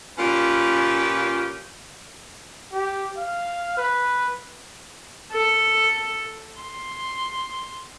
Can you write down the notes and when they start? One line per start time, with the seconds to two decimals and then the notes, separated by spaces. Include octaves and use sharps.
0.19 A#2 C#4 F4 G4 B4 C#5
2.72 G4
3.17 F5
3.77 B4
5.32 A4
6.61 C6